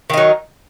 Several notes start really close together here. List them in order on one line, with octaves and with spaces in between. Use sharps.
D#3 D#4 F#3